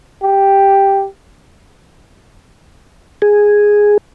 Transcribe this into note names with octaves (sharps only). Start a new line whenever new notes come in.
G4
G#4